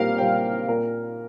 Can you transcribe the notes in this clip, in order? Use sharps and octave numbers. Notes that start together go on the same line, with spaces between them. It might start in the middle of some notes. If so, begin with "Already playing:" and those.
Already playing: A#2 G3 C4 G4 A#4 F5
A#2 G3 C4 G5
A#2 A#3 A#4